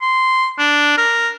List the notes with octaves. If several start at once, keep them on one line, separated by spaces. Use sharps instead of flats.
C6
D4
A#4